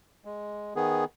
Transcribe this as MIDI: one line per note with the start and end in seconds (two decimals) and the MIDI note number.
0.25 0.74 56
0.76 1.05 51
0.76 1.05 59
0.76 1.05 68